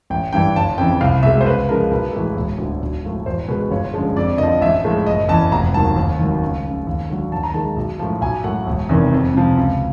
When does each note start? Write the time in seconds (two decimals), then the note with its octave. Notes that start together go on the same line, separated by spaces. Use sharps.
0.10 A1 G5
0.33 G2 E3 G3 G5
0.56 G1 A5
0.78 F2 C#3 E3 G5
1.01 C2 F5
1.23 B2 G#3 E5
1.41 C5
1.46 C#2 B4
1.68 C#3 F3 G#3 A#4
1.91 B1 B4
2.13 A2 E3 G#3
2.36 E1
2.58 D2 D3
2.81 B1
3.04 A2 F3
3.26 E2 C5
3.48 B2 G#3 B4
3.71 G1 C#5
3.94 F#2 D3 F3 G#3
4.16 F2 D5
4.38 D3 D#5
4.43 F3
4.61 A1 E5
4.85 A2 F3 G#3
5.06 F#1 D#5
5.28 E2 C#3 E3 A5
5.52 F1 A#5
5.74 D#2 D#3 F#3 A5
5.96 D#2
6.19 D#3 F#3
6.42 C#2
6.64 C#3 F3
6.87 D#2
7.10 D3 F#3
7.32 D#2 A5
7.43 A#5
7.54 D#3 G#3 A5
7.76 B1
7.99 A2 F3
8.21 B1 G#5
8.44 A2 F#3 F#5
8.67 E1
8.89 E2 C3 D#3
9.13 F2
9.35 C3 F3
9.57 C#2